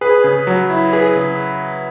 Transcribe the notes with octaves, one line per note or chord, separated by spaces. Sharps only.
G#4 B4
C#3
F#3
E4
G#4 B4
C#3